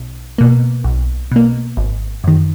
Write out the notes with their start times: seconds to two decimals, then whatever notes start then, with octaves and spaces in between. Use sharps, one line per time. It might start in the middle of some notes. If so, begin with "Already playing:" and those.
Already playing: B1
0.38 B2 A#3
0.84 B1
1.32 B2 A#3
1.77 G#1
2.24 F#2 D#3